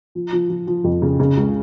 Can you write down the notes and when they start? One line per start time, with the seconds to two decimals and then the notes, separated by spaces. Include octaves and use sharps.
0.15 F3
0.32 F3
0.50 F3
0.67 F3
0.84 F2
1.02 C#3
1.20 C#3
1.37 C#2